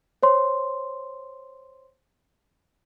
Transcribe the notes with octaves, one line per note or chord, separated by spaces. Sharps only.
C5 C#5 C6